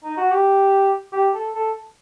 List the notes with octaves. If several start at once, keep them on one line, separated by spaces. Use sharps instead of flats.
D#4
F#4
G4
G4
A4
A4